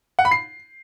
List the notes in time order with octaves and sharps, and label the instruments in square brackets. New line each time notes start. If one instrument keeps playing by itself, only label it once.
[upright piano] F#5
B5
C7